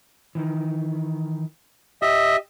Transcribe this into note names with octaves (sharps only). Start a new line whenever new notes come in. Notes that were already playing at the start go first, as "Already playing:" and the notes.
D#3 E3
G4 D#5 E5